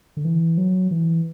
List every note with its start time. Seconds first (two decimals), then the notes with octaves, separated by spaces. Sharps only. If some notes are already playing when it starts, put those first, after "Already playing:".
0.17 D3
0.25 E3
0.57 F#3
0.91 E3